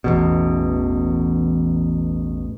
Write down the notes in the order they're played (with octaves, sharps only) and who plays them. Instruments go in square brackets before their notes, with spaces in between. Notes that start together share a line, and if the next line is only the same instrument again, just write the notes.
[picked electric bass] A1 E2 B2